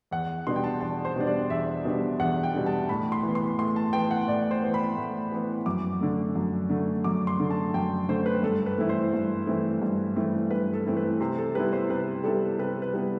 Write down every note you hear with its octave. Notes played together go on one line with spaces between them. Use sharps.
E2 F#5
B2 G3 D4 C6
G5
A5
E2 A5
C5
B2 G3 D4
D5
E2 E5
B2 G3 D4
E2 F#5
G5
B2 G3 D4
A5
A2 B5
C6
E3 B3
C6
A2 C6
A5
E3 B3 G5
F#5
A2 D5
C5
E3 B3
B5
A2
E3 B3
F#2 D6
D3 A3
F#2
D3 A3
F#2 D6
C6
D3 A3
A5
F#2 G5
D3 A3 C5
B4
G2 A4
B4
E3 A3 C4 E4
C5
G2
E3 A3 C4 E4
G2
E3 A3 C4 E4
G2 B4
A4
E3 A3 C4 E4
B4
C3 C5
A4
G3 B3 E4 B4
C5
C3 B4
G3 B3 E4 A4
C3 B4
B4
G3 B3 E4